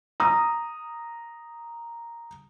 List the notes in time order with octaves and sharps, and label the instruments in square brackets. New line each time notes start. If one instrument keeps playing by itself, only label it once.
[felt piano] A#5 D#6